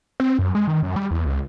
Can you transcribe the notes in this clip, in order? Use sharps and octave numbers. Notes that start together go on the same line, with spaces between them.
C4
F#2
G#3
D#3
F#2
G3
E2
C#2